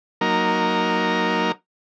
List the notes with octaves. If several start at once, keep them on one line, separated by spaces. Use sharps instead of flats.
F#3 A#3 D#4 A#4